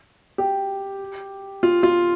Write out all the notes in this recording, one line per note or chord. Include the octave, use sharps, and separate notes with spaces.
G4
F4
F4